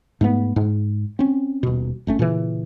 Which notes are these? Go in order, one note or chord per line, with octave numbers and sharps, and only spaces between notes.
G#2 A3 B3
G#2
C4 C#4
D#1 B2
F#1 A3 C#4
A#2 C#3 E3